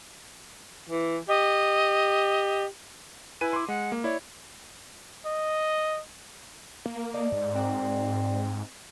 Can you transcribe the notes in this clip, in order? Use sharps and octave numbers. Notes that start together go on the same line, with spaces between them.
E3
G4 D#5
E4 B4 G#5 D#7
C6 D6
G#3 F#5
A#3
E4 C#5 D5
D#5
A#3
D#4 A4 D5
G#2
C4 F#4 A#4 D5